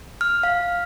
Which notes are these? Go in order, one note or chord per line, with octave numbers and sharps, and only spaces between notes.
F6
F5